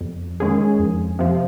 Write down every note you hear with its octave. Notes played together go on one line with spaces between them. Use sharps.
F2
D#3 G#3 C#4 G#4
F2
C3 F3